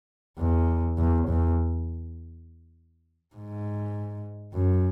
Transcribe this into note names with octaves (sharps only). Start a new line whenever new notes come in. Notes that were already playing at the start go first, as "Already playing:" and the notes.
E2
E2
E2
G#2
F#2